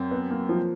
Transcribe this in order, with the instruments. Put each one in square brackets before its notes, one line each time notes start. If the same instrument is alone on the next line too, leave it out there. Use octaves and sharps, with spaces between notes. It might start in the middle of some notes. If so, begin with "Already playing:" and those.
Already playing: [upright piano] F#2 C4
[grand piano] B3
A#3
F3